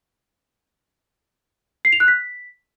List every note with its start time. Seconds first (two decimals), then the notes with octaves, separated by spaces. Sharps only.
1.85 C7
1.93 F7
2.00 F#6
2.08 B6